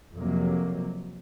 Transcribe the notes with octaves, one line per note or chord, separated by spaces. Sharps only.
F2 C3 F#3 A#3